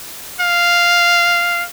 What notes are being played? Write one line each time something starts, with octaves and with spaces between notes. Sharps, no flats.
F5